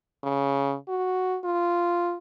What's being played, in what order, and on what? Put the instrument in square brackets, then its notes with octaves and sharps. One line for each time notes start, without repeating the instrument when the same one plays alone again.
[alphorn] C#3
F#4
F4